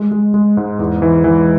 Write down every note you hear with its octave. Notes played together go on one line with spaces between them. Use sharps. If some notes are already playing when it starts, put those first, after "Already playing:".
Already playing: G#3
G#3
G#3
G#2
E2
E3
E3